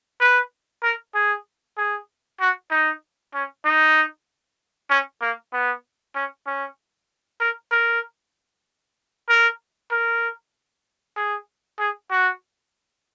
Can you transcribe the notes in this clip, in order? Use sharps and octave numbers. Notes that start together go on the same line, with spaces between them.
B4
A#4
G#4
G#4
F#4
D#4
C#4
D#4
C#4
A#3
B3
C#4
C#4
A#4
A#4
A#4
A#4
G#4
G#4
F#4